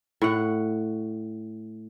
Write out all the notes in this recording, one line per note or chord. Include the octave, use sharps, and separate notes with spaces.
A2 F#5